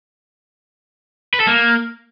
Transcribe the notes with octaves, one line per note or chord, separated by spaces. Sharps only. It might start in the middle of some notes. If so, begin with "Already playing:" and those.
B4
A4
A#3